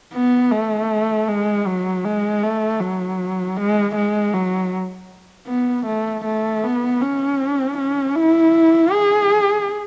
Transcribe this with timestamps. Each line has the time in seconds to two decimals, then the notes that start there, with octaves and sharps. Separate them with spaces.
0.13 B3
0.51 A3
1.28 G#3
1.66 F#3
2.05 G#3
2.43 A3
2.81 F#3
3.57 G#3
3.95 G#3
4.33 F#3
5.48 B3
5.86 A3
6.25 A3
6.63 B3
7.02 C#4
7.78 C#4
8.15 E4
8.92 G#4